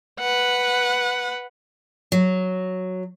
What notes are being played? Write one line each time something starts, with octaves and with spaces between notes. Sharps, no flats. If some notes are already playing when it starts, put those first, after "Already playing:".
B4 F#5
F#3